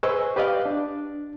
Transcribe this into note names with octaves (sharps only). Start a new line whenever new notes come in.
G#4 B4 C5 D#5 C#6 E6
G4 B4 D5 D#5 F5
D4